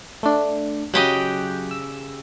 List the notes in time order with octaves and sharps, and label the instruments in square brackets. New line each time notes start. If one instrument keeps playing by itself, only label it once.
[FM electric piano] A3 D4
[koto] C#3 G4 D#5 [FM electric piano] F#3 F#6 G6
[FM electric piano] E6